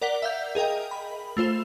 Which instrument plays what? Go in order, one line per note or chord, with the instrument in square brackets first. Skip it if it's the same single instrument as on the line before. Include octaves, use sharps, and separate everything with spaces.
[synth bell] A#4 D5 F#5 B6 F7 G7
E5 F5 G6
G#4 A#4 D#5 G5
B5
A3 F4 C5 E7